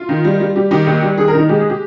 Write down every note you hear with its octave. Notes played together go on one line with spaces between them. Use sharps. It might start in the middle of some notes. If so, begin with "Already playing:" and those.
Already playing: F4
D#3
G3
G3
G3 G4
D#3 G4
D#2
G3
D#3 G#4
A#4
D#3 D#4
G#3 G4
G#4
G4